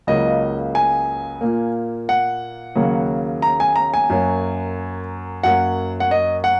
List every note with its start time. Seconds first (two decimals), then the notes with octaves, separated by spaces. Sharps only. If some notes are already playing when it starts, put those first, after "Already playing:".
0.07 C#2 C#3 F#3 A#3 D#5
0.75 G#5
1.41 A#2 A#3
2.09 F#5
2.75 D#2 C#3 F#3 A#3
3.42 A#5
3.60 G#5
3.76 A#5
3.94 G#5
4.10 F#2 F#3 A#3
5.43 F#2 F#3 A#3 F#5
6.00 F#5
6.11 D#5
6.44 F#5